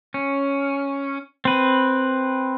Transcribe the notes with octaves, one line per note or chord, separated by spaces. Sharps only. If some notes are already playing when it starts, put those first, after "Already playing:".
C#4
C4 B4